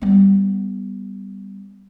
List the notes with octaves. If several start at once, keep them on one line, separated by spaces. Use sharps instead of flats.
G3 B3